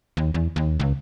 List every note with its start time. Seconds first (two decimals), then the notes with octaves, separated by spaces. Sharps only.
0.17 D#2
0.34 E2
0.56 D#2
0.80 C#2